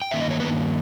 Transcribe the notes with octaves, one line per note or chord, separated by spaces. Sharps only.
G5
G2 D#3 A#3 E5
D#5
C#5
B3 B4